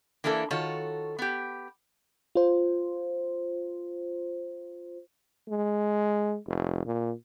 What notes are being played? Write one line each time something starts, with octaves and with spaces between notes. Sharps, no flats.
E3 A#3 D4 E4 A4
D#3 F4 F#4 A4 C#5
B3 G4
F4 C5
G#3
F1
A#2